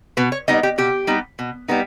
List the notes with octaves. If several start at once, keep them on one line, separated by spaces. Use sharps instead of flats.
B2 B4
C#5
G3 B3 D#4 D#5
G4
B2 G4
G3 B3 D#4
B2
G3 B3 D#4